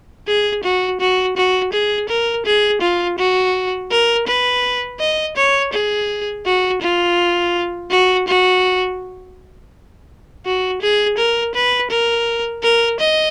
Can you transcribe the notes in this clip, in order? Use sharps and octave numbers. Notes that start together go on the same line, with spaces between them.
G#4
F#4
F#4
F#4
G#4
A#4
G#4
F4
F#4
A#4
B4
D#5
C#5
G#4
F#4
F4
F#4
F#4
F#4
G#4
A#4
B4
A#4
A#4
D#5